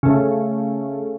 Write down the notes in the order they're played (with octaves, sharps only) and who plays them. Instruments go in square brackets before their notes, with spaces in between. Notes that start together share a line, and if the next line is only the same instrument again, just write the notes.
[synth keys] C#3 A3